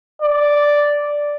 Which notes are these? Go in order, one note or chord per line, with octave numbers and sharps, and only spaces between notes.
D5